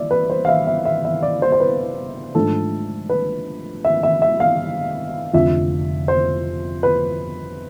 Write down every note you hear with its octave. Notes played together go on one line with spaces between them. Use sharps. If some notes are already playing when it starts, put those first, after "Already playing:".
Already playing: E3 D5 E5
B4
C5
F5
E5
E5
E5
E5
D5
C5
C5
B4
G#2 F3 A3 D4 A4
B4
E5
E5
E5
F5
F1 F2 D3 F3 E5
C5
B4